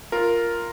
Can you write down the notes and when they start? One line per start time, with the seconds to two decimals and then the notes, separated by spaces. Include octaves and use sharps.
0.12 F4 A#4